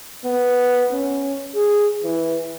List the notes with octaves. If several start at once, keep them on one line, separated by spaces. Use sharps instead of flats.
B3
C#4
G#4
E3